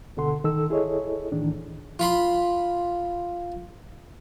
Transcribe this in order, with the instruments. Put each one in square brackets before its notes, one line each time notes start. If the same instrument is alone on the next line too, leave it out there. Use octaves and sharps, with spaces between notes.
[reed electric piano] D2 B2 D3 A4 F#5 C6
D#3 A4 E6
E4 G#4 A4 C#5 D#5
A2 D#3 E3 D4
[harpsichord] F4 B5 C6